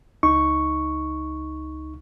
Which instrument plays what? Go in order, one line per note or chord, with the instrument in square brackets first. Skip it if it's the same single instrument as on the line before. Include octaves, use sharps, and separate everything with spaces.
[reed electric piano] C#2 D#4 C#6